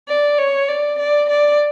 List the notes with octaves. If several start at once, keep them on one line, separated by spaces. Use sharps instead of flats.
D5
C#5
D5
D5
D5